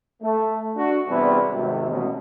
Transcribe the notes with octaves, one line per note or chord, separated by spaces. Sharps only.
A3
D4 F#4
E2 C3 G3 B3 D4 E4
G#1 C3
A1 B2